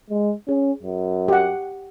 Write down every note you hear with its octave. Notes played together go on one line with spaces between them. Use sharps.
G#3
C#4 G#4
F#2
G4 F#5